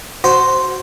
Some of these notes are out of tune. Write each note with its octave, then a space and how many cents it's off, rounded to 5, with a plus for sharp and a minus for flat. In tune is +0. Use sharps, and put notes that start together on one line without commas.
F#4 +0 C5 +0